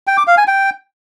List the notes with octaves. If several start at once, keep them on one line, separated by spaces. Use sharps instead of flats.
G5
D6
F5
G#5
G5